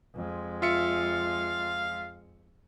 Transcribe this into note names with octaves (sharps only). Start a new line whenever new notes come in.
F2 G#3
F4 E5 F5 C#7